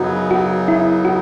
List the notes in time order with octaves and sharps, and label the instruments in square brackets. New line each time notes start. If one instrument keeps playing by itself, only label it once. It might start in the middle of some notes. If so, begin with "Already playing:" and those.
Already playing: [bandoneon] F#2 C#3 F#3 B3 D#4 [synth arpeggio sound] F#4
[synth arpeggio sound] F#4
E4
F#4